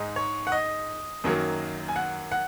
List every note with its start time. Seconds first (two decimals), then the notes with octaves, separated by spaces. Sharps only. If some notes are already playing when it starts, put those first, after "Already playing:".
Already playing: G#2 G#3 D#4
0.16 C#5
0.47 F#5
0.52 D#5
1.24 F#2 D#3 F#3 A#3
1.89 G#5
1.96 F#5
2.32 F#5